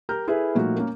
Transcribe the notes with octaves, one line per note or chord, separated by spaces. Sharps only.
G4 A#4 A#5 F6 G6
E4 G#4 A4 B4 E5
A#2 F3 A3 D#4 F#4
A#3 C#4 A#4